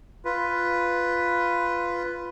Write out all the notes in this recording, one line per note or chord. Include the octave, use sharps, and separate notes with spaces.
F4 B4